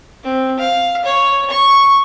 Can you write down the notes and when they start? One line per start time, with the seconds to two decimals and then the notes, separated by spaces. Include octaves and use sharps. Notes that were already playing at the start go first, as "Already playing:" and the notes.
0.24 C4
0.60 F5
1.05 C#5
1.51 C#6